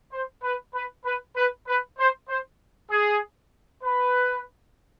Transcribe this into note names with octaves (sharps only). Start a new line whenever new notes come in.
C5
B4
B4
B4
B4
B4
C5
C5
G#4
B4